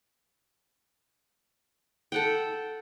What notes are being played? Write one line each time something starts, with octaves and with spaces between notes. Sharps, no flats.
A4 F#5 G5